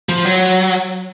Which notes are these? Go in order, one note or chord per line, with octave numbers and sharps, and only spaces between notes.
F3
F#3